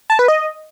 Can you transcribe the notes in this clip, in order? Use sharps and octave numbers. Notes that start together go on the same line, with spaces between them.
A5
B4
D#5